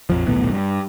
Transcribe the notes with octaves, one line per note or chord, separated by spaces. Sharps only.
A#1 F2 F3
D#1 B1 A2 B3
G2